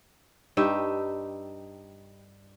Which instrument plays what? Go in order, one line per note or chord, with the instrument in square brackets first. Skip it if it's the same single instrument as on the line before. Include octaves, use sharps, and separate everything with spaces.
[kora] G2 D#4 G4 E5